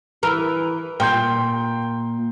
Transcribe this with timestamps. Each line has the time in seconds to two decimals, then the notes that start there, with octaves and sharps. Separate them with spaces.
0.23 E3 A#4
1.00 A#2 G5 C6 G6